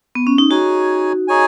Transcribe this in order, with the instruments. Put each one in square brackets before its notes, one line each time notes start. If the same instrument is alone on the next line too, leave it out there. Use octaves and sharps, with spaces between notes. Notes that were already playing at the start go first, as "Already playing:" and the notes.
[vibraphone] B3
C#4
D#4
[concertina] D#4 G#4 C#5 G#5 [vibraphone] F#4
[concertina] D#4 G#4 C#5 G#5